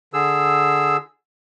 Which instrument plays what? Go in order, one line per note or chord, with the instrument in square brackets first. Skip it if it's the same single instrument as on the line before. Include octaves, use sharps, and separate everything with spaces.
[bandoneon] D3 G#4 E6